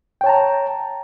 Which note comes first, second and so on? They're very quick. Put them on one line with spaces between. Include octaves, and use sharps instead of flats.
G5 C#5 A5 A#5